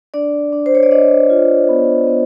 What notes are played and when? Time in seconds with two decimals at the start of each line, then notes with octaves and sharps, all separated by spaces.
0.14 D4 D5
0.52 D4
0.66 C5
0.75 C#5
0.83 D5
0.91 D4 D#5
1.30 F4
1.69 B3
2.07 B3